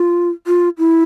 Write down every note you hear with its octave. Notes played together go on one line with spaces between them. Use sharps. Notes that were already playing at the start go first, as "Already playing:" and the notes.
Already playing: F4
F4
E4